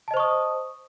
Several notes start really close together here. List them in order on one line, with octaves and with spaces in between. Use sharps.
A5 D#5 C5 C#6 D#6